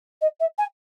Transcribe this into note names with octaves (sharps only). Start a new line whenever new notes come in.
D#5
E5
G#5